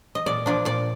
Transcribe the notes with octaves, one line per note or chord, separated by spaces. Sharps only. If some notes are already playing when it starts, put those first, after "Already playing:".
D#5
A#2 D5
F3 A#3 D4 D5
A#2 D5